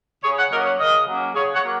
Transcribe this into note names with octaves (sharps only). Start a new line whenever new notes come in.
C#3 G#4 C#5
C#5 F#5
F#3 A#3 C#4 A#4 D#5
C#5 F#5
C#3 A#4 D#5
F#3 A#3 C#4
C#3 G#4 C#5
C#5 F#5
F#3 A#3